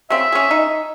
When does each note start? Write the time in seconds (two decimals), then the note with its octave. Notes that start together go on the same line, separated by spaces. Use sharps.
0.10 C#3 C4 E5
0.32 C#4 G#4
0.51 D#4